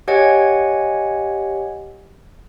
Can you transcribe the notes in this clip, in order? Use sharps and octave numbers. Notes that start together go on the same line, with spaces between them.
G4 C#5 D#5 F#5 G#5 G#6